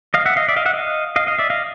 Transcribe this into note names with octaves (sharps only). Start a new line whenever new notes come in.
D#5 F5
E5 F#5
D#5 F5
D5 E5
D#5 F5
E5 F#5
D#5 F5
D#5 F5
D#5 F5
D5 E5
D#5 F5